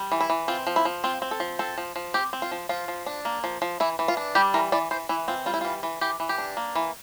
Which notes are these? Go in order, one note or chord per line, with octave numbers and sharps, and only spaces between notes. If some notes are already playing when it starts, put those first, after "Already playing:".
Already playing: G3
E3
E4
E3
C4 F4
F3
E4
F3
C4 F4
C4
A4
F3
C4 A4
F3
F3
C4 G4
C4
F4
F3
F3 F4
F3
D4
A#3
F3
F3
E3 E4
E3
F4
D4
G3 G4
E3 A#4
E3 D5
E3 C5
E3 E4
C4 F4
G3 F4
E4
E3 F4
E3
E3 G4
E3
G4
D4
A#3
E3